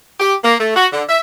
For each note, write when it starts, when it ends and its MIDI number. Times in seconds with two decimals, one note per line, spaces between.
0.20 0.35 67
0.43 0.55 58
0.60 0.74 57
0.76 0.86 66
0.92 1.03 50
1.08 1.20 76